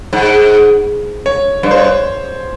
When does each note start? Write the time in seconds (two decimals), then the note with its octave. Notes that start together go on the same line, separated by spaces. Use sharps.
0.13 G#2
1.26 C#5
1.63 G2 C#5
1.71 C5
1.78 C#5